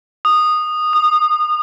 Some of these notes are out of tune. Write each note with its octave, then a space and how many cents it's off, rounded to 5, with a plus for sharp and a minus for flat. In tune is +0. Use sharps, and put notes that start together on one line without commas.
D#6 -15
D#6 -30